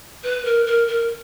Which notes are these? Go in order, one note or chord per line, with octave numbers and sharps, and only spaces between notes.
B4
A#4
A#4
A#4